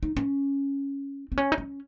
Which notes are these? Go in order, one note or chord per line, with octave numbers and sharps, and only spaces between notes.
D#4
C#4
C4
C#4
D#4
C#4